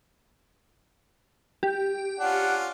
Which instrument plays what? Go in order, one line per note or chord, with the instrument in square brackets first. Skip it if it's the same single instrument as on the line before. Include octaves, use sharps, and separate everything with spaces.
[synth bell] G4
[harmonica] C#4 D4 F4 [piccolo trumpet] F#5